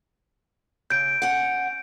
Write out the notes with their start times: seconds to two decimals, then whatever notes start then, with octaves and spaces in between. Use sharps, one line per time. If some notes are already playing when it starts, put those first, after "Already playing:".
0.90 C#3 G6 D7
1.22 C#4 F#5